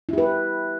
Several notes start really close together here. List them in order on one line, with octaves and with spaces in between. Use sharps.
E4 G4 B4